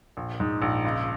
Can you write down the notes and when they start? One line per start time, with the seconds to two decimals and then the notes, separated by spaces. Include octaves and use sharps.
0.17 A#1
0.40 G#2
0.62 A#1
0.85 C#2